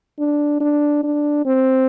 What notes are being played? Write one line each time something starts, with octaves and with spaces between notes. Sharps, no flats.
D4
D4
D4
C4